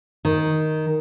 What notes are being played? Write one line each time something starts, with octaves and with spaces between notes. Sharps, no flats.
D#3